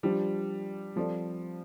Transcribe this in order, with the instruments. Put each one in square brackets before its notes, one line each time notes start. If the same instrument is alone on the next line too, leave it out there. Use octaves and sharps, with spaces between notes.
[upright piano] F3 D4 G4 D5 [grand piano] G3
[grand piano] F3 [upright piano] G3 C4 A4 D5